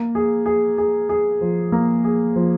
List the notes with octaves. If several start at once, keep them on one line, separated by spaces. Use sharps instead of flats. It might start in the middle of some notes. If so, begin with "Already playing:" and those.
Already playing: A#3
G#4
G#4
G#4
G#4
F3
A#3
G#4
F3